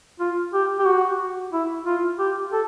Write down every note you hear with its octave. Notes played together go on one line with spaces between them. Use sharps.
F4
G4
G4
F#4
E4
F4
G4
A4